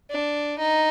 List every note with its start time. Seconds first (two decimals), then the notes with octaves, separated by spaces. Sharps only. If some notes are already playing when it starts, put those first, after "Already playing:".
0.10 D4
0.59 D#4